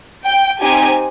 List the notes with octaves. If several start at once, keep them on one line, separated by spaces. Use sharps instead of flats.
G5
C4 D#4 G4 G#5